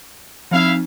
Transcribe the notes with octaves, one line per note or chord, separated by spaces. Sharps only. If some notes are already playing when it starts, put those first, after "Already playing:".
F3 C4 D#4 E4 E5 F5